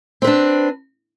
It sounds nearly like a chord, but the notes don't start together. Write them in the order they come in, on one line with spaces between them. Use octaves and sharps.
C4 B4 D4